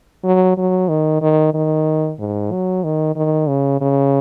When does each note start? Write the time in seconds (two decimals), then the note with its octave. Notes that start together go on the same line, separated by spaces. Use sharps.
0.24 F#3
0.58 F#3
0.89 D#3
1.21 D#3
1.54 D#3
2.19 G#2
2.52 F#3
2.84 D#3
3.16 D#3
3.48 C#3
3.81 C#3